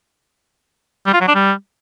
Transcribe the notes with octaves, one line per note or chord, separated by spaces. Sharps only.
G3
F4
F#3
D4
G3